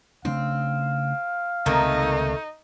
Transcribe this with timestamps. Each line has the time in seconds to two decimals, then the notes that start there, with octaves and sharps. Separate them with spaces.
0.25 C#3 A3 C4 D4 F5
1.66 C#2 C3 D#3 A3 A#3 C4 D#4